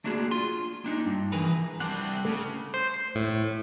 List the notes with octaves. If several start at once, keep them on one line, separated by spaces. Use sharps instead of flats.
A3 A#3 D4 F#4 G#4
F4 C6
A#3 D4 D#4
G2
E3 F3 G#4 A#4 B4
C2 G3 C4 D4 F#5 G5 A5 D6
C#3 A3 G#4 A4
C5
C7
A2